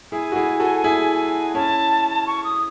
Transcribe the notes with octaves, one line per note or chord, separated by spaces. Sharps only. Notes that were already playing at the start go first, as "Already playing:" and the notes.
E4 G#4 G#5
F#4
E4 G#4
F#4 A4
E4 G#4
C#4 E4 A5
C#6
D#6